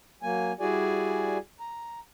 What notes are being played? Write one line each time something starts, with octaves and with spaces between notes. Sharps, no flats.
F#3 A#3 G#5
G3 E4 F#4 G#4 D5 G#5
A#5